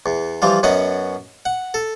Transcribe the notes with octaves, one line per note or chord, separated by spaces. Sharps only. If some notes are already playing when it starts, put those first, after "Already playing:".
E2
E3 F3 G3 F4
F#2 B3 C#4 D#5 F#5
F#5
A4